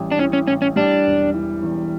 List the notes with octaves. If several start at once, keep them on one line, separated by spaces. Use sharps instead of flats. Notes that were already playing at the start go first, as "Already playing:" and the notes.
Already playing: A1 G3
D4
E3 C#4
C#4
A2 C#4
C#4
G3 D4
E1
E3
E2